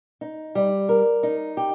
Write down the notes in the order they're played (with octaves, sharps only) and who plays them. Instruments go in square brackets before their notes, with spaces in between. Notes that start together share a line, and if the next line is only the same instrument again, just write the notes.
[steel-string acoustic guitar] D#4
G3
A#4
D#4
G4